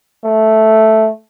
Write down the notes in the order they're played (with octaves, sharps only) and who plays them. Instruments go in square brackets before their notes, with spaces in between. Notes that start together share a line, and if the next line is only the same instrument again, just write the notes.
[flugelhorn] A3